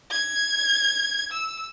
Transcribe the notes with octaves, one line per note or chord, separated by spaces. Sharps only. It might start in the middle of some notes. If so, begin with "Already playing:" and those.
G#6
E6